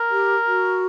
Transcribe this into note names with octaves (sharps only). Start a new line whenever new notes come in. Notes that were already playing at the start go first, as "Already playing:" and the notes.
Already playing: A#4
G4
F#4